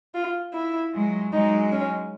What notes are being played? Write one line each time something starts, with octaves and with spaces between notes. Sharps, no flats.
F4
E4
F#3 G#3
F#3 G#3 D#4
C#4